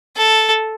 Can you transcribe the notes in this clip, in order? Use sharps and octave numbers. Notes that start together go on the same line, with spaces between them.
A4